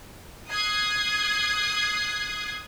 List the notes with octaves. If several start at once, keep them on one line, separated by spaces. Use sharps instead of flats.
D#6 F#6 G#6 C7